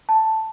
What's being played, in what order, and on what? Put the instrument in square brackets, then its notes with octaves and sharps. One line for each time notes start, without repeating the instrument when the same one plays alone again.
[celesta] A5